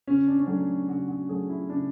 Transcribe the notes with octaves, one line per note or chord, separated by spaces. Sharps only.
C#3 C#4
D4
C#4
F#3 A3 D4
C#3 F#4
F#4
F#3 A3 G#4
E4
C#3 D4